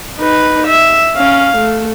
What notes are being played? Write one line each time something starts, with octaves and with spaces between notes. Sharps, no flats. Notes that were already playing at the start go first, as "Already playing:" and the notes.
D#4 B4
E5
C#4 F5
A3